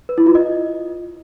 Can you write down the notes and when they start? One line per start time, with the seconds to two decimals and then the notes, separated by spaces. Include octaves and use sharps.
0.09 B4
0.18 E4
0.26 F4
0.35 D#5